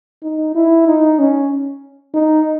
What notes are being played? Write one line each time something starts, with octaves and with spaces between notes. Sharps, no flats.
D#4
E4
D#4
C#4
D#4